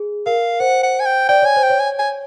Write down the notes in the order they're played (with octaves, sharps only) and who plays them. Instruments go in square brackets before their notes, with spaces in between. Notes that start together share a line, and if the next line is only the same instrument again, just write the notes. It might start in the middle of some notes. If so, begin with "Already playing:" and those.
Already playing: [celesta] G#4
[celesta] A#4 [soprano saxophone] F5
[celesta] C5 [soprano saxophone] F#5
[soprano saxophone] F#5
G#5
G5
[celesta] D5 [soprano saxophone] G5
[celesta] C#5 [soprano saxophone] G#5
[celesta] C5
[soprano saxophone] G5
[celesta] C#5
[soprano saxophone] G#5
G#5